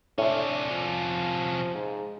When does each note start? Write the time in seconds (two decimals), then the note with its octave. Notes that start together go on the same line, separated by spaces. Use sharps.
0.18 A2 C3 C#4 D4
0.70 F3
1.75 G#2